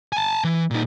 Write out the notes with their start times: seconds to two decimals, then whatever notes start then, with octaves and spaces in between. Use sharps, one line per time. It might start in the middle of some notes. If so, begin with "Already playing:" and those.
0.13 G#5 A5
0.44 E3
0.71 A#2 D#4